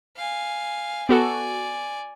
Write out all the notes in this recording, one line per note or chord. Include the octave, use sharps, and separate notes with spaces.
F5 G#5
B3 F#4 A4 D5 G#5